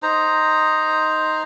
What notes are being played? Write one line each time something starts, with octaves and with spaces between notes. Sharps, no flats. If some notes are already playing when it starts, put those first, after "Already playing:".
D#4 C5 A#5